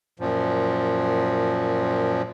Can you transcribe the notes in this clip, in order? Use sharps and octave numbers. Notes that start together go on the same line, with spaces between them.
F#2 A#2 F3